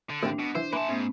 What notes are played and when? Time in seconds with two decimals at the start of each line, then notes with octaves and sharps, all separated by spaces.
0.10 D3
0.23 A1 D#2 C4 D4
0.39 B2
0.55 E3 C5
0.73 A#3 B4 E5 G#5 A5 C6
0.89 G#2 A3 B3 C#4